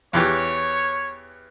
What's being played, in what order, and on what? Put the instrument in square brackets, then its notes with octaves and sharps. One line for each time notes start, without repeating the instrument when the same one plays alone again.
[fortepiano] E2 E3 G4 [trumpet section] C#5